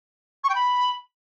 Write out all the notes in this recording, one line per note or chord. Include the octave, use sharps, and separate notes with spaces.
C#6
G5
B5